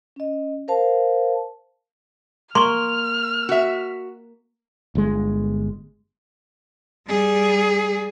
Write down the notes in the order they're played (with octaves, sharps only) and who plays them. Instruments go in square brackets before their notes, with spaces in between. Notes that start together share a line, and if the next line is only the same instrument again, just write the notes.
[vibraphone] C#4 D#5
A#4 C5 F5 A5
[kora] A#3 [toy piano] C6 C#6 [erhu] F6
[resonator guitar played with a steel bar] F#4 E5
[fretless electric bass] G1 G#3
[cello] G3 G#4